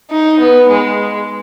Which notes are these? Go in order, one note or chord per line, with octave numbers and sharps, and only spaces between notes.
D#4
B3
G#3